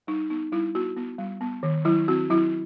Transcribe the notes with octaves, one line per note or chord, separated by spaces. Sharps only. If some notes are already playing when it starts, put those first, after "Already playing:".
G3 D#4
B3 D#4
G3 E4
B3 F#4
B3
G3
B3
D#3
F#3 E4
C4 F#4
F#3 E4